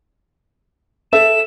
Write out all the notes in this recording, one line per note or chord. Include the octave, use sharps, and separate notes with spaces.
A4 E5 E7